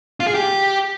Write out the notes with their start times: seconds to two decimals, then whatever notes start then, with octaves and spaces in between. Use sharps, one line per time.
0.20 F4
0.27 G#4
0.34 G4